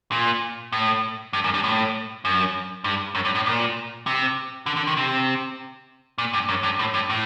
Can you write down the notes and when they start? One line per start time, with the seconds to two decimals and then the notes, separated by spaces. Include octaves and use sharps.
0.12 A#2
0.72 A2
1.33 G2
1.44 F#2
1.54 G2
1.64 A2
2.25 F#2
2.84 G2
3.15 F#2
3.25 G2
3.35 A2
3.46 A#2
4.07 C3
4.66 D3
4.77 D3
4.87 D#3
4.97 C3
6.18 A#2
6.33 G2
6.49 F#2
6.63 G2
6.79 A2
6.94 G2
7.10 A2